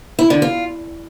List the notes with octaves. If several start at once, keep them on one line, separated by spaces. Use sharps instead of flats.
E4
D3
F4